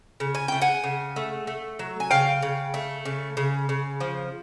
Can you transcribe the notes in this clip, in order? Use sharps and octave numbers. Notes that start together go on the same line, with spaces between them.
C#3
G#5
A3 G5
F#5 G#5
C#3
A3
A3
F#3
G#5
C#3 F5 G5
C#3
A3
C#3
C#3
C#3
F3